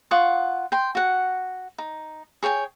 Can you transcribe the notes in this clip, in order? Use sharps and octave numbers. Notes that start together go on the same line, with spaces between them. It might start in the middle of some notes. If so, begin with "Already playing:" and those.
F4 F#5 C#6 D#6
G5 C6
F#4 F#5
D#4
G#4 C#5 G5 G#5